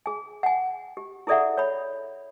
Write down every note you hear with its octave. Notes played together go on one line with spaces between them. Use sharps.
G#4 G#5
F#5 G#5
G4
E4 G#4 A4 D5 E5 F#5
C#5 B5